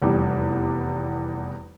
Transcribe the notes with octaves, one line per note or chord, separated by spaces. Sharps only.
F1 E2 G3 G4